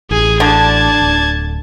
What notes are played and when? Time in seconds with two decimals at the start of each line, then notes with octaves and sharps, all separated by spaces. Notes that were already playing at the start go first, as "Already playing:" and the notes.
0.11 A1 G#4 G#5
0.40 D3 D4 D5 A5 G#6
1.02 D1